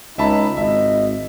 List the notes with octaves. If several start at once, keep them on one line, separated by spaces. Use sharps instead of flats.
C#2 D#4 E5 A5 B5
G#1 D#5 E5